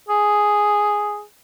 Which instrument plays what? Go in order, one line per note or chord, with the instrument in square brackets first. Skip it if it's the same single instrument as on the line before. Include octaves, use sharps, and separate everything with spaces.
[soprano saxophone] G#4